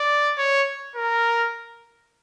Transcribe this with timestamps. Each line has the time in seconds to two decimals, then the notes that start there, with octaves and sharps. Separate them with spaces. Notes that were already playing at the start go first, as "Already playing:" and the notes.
Already playing: D5
0.38 C#5
0.96 A#4